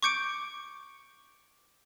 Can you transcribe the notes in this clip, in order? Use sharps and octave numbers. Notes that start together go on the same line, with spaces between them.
C#6 D6 G6 C#7 D7